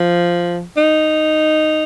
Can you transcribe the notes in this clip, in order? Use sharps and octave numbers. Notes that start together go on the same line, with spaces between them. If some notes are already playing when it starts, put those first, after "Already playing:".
Already playing: F3
D#4